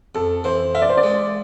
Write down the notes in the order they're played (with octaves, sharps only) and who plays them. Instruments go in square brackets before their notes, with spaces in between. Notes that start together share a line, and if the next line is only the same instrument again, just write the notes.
[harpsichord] F2 [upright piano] A4
[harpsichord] E3 [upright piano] C5
[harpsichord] F4 [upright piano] E5
[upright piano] D5
C5
D5
[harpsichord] G#3